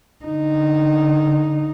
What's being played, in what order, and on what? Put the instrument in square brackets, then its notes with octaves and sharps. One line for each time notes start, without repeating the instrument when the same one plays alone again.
[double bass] D3 D#4